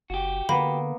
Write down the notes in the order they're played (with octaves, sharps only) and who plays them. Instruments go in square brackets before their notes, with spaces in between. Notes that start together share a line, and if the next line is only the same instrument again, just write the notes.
[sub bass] F#1 [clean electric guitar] F#4 G4
[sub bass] D3 [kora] A#3 B3 [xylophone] B5